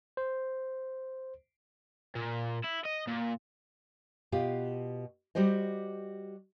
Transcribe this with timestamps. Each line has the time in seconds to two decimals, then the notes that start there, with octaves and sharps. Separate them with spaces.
0.17 C5
2.16 A#2
2.64 E4
2.85 D#5
3.08 A#2
4.32 B2 F4 G4
5.35 G3 F#4 G4 C5 D#5